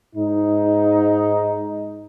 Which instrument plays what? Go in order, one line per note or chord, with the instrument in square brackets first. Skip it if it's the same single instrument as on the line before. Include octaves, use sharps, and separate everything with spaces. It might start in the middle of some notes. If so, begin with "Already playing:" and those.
[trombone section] G#2 D#4